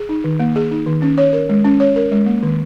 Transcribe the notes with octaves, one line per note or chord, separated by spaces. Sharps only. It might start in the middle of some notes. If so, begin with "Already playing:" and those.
Already playing: G#4
D#4
D#3
A#3
G#4
D#4
D#3
C#4
C#5
A#4
G#3
C#4
C#5
A#4
G#3
A#3
D#3